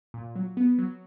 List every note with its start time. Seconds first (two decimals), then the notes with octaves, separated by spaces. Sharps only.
0.14 A#2
0.35 F#3
0.57 B3
0.78 F#3